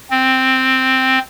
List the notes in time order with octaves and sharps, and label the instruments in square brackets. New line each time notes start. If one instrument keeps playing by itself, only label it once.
[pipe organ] C4